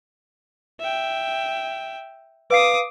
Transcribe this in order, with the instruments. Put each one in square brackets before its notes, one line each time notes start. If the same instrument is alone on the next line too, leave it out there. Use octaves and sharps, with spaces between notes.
[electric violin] E5 G5
[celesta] B4 F5 C7 [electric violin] D6 D#6